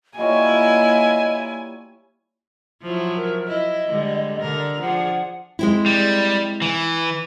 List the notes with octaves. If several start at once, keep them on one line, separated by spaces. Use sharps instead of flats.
G3 A#3 E4 F4 C#5 D#5 G#5
F3 F#3 E4
A#4
E4 D#5
D3 G3 G#3
D3 A#4
F3 D4 G#4 F#5
G#3 C4 E4
G3
E3